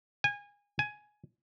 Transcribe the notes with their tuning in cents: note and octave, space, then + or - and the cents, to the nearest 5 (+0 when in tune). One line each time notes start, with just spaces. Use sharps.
G#5 -25
G#5 +10